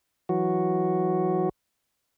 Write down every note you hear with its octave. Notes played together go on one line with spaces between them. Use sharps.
E3 F#3 F#4